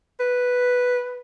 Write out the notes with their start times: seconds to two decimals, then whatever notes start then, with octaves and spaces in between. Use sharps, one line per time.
0.20 B4